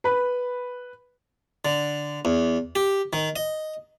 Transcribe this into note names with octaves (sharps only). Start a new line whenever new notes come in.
B4 B5
D3
E2
G4
D#3
D#5